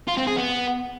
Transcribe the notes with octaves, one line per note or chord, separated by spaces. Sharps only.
F4
C4
G#4
B3